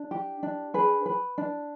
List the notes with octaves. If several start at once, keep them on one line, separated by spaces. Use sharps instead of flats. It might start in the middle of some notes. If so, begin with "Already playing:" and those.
Already playing: D4
G4
D4
G#4 B4
B4
D4